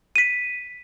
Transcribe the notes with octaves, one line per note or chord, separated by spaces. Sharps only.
B6 D#7